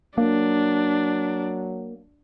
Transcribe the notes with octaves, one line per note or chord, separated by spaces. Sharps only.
F#3 A#3 D4